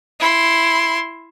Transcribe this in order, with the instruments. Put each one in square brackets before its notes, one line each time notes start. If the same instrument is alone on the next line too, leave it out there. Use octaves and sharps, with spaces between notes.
[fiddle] E4 C6